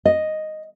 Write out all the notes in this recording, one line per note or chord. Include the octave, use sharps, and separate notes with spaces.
D#5